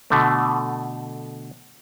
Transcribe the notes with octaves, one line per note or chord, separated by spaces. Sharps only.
B2 D3 A3